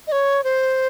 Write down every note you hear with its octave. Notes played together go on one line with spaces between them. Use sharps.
D#5
C#5
C5